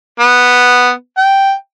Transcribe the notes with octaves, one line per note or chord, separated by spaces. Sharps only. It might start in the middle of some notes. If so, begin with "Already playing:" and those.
B3
G5